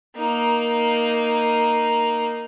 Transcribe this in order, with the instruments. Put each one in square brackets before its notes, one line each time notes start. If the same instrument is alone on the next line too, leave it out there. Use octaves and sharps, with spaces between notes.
[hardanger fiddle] A#3 D#4